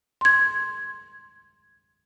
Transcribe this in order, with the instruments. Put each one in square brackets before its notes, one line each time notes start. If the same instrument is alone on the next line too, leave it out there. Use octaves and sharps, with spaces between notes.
[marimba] C6 G#6